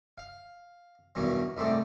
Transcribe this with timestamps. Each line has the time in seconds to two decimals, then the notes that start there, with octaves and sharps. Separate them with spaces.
0.18 F5
1.15 E2 G2 B2 D#3 F#3
1.57 C2 G#2 A3 C4 D#4 D5